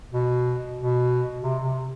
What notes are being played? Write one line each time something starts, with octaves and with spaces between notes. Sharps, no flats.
B2
B2
C3
C3